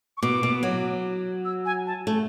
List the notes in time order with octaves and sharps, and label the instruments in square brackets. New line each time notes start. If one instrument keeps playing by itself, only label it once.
[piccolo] C#6
[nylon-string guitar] B2 [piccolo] D6
[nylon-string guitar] B2
F#3
[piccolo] E6
G#5
A5
[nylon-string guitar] A3